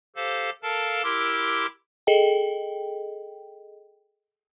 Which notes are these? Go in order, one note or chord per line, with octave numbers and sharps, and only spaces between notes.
G4 A4 C5 F5
A4 A#4 F5 A5
E4 G4 A#4 C6 D6 E6
G#4 A4 D#5 G5